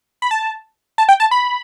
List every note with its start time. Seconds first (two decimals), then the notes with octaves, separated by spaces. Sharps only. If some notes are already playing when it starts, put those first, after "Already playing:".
0.22 B5
0.31 A5
0.98 A5
1.09 G5
1.20 A5
1.31 B5